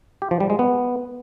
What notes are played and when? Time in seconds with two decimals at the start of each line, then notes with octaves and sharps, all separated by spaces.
0.22 G4
0.31 F3
0.40 G3
0.50 G#3
0.59 B3